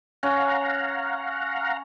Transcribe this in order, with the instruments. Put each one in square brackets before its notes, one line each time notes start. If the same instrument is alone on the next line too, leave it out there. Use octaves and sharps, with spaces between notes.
[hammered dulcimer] C#4 [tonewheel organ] F5 F#5 A#5